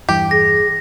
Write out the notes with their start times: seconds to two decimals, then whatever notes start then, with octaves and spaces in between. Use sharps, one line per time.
0.09 E2 G2 E3 G4
0.31 G#4 A#6